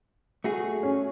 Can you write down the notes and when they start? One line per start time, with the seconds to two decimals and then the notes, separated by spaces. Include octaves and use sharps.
0.44 A3 F#4 G#4
0.83 C#4